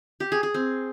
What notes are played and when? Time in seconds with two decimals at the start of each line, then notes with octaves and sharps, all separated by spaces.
0.20 G4
0.32 G#4
0.43 G#4
0.54 C4